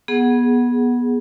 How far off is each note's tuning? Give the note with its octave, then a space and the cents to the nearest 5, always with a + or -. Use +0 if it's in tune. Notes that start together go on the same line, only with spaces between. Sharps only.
B3 -20 G#4 +0 F#5 +0